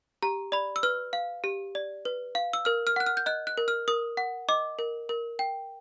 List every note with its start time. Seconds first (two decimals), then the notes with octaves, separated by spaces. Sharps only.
0.23 G4 A#5
0.52 D5 B5
0.76 E6
0.83 B4 F6
1.13 F5
1.44 G4
1.75 D5
2.05 B4
2.35 F5
2.53 E6
2.65 A#4 F6
2.87 F6
2.96 F#5 F#6
3.06 F6
3.17 G6
3.26 D#5 F#6
3.47 F#6
3.57 A#4
3.68 F6
3.88 A#4 D#6
4.17 F#5
4.49 D#5 D6
4.79 A#4
5.09 A#4
5.39 G5